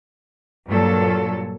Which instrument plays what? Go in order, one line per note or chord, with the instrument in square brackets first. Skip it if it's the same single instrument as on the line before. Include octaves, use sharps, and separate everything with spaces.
[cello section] G2 A#2 F#3 A4